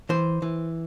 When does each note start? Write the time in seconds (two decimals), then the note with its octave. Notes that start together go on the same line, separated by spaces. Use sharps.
0.09 E3 C5
0.42 E3